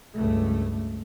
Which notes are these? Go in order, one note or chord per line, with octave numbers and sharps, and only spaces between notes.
C#2 G2 A3